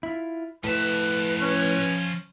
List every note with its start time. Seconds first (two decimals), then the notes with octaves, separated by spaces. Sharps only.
0.03 E4 F4
0.64 A2 F3 B4 E5
1.40 C#4